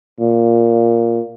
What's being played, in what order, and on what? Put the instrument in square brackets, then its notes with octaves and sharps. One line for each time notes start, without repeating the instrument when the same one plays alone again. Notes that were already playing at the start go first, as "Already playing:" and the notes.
[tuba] A#2